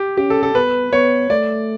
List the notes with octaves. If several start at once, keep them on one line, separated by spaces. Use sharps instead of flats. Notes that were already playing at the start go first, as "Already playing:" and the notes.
Already playing: G4
C#4 G4
A4
A4
B3 B4
B3 C#5
A3 D5